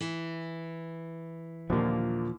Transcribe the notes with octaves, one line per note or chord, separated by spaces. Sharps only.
E3
D#2 A#2 D3 F3 A#3